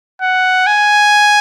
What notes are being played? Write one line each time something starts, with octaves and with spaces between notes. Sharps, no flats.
F#5
G#5